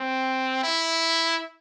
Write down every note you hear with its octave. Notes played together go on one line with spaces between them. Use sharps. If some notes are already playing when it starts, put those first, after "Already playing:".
Already playing: C4
E4